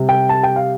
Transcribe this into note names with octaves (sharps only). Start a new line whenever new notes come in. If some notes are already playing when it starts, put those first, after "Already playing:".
Already playing: C3 G3
G5
A5
G5
F5